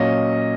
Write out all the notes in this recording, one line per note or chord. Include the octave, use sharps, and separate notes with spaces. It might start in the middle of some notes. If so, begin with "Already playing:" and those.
Already playing: A#2 F#3 A#3 C#4 D#5